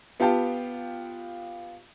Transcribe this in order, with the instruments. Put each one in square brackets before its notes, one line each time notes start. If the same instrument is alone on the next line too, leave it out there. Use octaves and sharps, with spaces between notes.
[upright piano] B3 F4 G4 F5 G5 A5